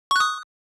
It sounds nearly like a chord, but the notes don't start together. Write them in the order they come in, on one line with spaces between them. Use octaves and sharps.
C#6 F#6 D#6